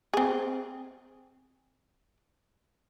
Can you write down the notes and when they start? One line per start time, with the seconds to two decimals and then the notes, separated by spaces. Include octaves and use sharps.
0.13 C4 G#4